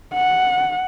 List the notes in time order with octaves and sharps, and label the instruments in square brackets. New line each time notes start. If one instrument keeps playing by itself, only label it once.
[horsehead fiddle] F#5